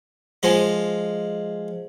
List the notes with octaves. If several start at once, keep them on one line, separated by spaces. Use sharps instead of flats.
F3 G#3 D#5